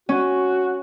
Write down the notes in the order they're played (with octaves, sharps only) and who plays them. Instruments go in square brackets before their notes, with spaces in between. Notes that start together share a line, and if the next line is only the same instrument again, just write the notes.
[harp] C#4 [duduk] F#4